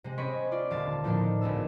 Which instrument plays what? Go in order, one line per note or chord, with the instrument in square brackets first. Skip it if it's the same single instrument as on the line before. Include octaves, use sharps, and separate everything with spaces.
[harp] C3 G#3
C4 C#4 G#4 D#5 B5 C#6
F4 D5
D#1 D3 F5 A5
A2 F3 A#3 B3 D4 D#4
G#1 C#2 B3 E6